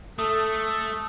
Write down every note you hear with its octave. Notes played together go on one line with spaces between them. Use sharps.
A3 A4 D#6